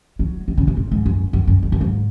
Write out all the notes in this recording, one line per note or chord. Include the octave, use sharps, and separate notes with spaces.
F#3
D#3
C#3
C3
A#2
G#2
F#2
F#2
F#2
F2
F#2
G#2